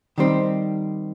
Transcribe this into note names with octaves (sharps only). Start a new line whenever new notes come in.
D#3 G3 C4